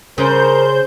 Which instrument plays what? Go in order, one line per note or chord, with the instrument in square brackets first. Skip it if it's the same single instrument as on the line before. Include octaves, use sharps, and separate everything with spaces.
[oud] C#3 [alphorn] A#4 [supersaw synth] C5 G6